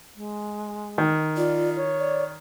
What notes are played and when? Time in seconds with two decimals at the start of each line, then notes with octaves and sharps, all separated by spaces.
0.16 G#3
0.98 D#3
1.37 F4 D5
1.76 C#5
1.99 D5